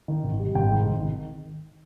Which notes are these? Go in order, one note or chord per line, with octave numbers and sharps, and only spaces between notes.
D#3
G#1
G3
G#1 G5
G#2
G#1
D#3